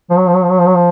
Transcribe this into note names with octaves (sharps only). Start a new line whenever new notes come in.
F3
F#3
F3
F#3
F3
F#3
F3
F#3
F3